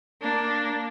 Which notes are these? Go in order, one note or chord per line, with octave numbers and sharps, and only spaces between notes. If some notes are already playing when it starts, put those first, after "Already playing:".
A#3 D4